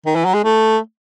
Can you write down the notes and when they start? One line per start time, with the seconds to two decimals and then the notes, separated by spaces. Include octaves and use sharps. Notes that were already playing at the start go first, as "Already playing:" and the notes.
0.05 D#3
0.15 E3
0.25 F#3
0.34 G#3
0.44 A3